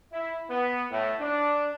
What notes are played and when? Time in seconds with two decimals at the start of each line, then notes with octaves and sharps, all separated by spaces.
0.12 E4
0.50 B3
0.91 A2
1.19 D4